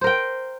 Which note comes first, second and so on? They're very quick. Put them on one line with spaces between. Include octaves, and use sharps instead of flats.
C5 A#4 G5